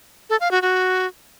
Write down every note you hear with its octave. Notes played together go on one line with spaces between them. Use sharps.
A4
F5
F#4
F#4